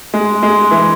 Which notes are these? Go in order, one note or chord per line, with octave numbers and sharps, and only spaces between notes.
G#3
G#3
E3